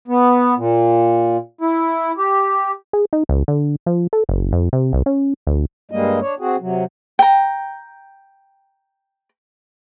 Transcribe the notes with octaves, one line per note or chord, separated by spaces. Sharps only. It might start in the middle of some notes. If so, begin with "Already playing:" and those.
B3
A#2
E4
G4
G#4
D#4
C#2
D3
F3
A4
F#1
F2
C3
C2
C#4
D2
G2 G3 G#3 A#3 D#5
D4 C#5
C4 F#4 G#4
C3 F#3
G5 A#5